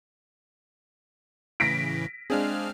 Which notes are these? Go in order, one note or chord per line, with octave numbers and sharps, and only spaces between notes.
A2 C#3 E3 A#6 B6 D7
G#3 C4 D4 G#4 F5 F6